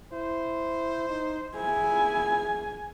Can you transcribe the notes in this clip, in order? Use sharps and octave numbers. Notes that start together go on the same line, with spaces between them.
E4 C5
D#4
E4 G#4 G#5